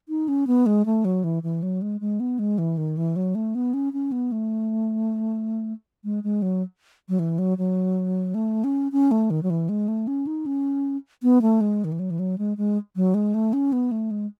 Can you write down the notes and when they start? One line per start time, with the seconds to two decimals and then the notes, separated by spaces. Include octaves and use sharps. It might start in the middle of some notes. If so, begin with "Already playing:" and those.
0.09 D#4
0.28 C#4
0.47 B3
0.66 G#3
0.86 A3
1.05 F#3
1.24 E3
1.43 E3
1.63 F#3
1.82 G#3
2.01 G#3
2.20 B3
2.39 G#3
2.58 E3
2.77 D#3
2.97 E3
3.16 F#3
3.35 A3
3.55 B3
3.74 C#4
3.93 C#4
4.12 B3
4.32 A3
6.04 G#3
6.24 G#3
6.42 F#3
7.09 F#3
7.19 E3
7.39 F#3
7.58 F#3
8.34 A3
8.64 C#4
8.92 C#4
9.11 A3
9.30 D#3
9.43 F#3
9.50 E3
9.69 G#3
9.88 A3
10.07 C#4
10.27 D#4
10.46 C#4
11.23 B3
11.42 A3
11.61 G#3
11.84 D#3
11.92 E3
11.99 F#3
12.11 E3
12.19 F#3
12.38 G#3
12.57 G#3
12.96 F#3
13.14 G#3
13.34 A3
13.53 C#4
13.72 B3
13.91 A3
14.11 G#3